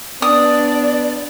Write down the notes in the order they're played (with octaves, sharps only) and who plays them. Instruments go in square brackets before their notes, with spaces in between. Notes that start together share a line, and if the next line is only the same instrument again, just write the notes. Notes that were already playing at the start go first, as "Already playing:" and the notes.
[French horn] B3 [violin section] D4 [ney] D5 [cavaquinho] D#6